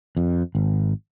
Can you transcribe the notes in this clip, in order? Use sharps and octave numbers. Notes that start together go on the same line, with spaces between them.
F2
G#1